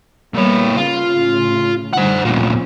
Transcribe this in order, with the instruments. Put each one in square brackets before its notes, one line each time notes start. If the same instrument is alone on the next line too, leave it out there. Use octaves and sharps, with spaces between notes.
[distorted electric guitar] A#2 C#5 [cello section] G3 A#3 B3
[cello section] C#3 [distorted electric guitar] F4
[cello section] A2 C#3
[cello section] D3 G3 [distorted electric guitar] C5 F#5
[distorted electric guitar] D2 A#2 [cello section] F3 C#4